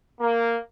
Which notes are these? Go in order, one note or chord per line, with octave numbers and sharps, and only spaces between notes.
A#3